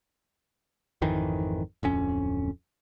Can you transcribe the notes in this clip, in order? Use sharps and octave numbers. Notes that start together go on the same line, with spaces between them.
G#1 F2 D#3 E3
D1 F2 C#4